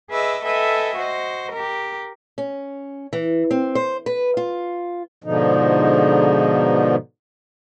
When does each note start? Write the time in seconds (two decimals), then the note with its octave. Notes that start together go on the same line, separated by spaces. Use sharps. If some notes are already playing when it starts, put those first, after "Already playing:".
0.10 G#4 B4 D#5 E5 D6 E6
0.44 A4 B4 D#5 E5 G5 G#5
0.96 F#4 C5 D#5
1.52 G4 A#4
2.38 C#4
3.13 E3
3.51 C4
3.75 C5
4.06 B4
4.37 F4
5.24 G#2 B2 D3 F3 D#4